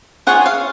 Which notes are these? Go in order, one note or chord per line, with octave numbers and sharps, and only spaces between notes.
F4 G#4 C#5 F#5
F5